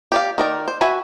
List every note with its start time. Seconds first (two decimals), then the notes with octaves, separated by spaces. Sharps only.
0.12 G4 D5 F5
0.38 D#3 A#4 D5
0.68 C5
0.81 F#4 B4 E5 G#5